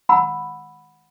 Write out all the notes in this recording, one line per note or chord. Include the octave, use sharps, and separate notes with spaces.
F#5 B5 E6